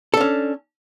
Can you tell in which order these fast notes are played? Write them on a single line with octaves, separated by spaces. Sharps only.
A4 D4 C#4